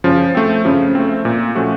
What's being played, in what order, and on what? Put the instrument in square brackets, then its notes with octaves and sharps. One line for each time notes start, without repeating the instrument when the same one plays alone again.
[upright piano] C#3 [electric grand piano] F3
[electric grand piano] A3 C4
[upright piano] C#3 [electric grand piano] F3
[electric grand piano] A3 C4
A#2
F3 A3 C#4 F#4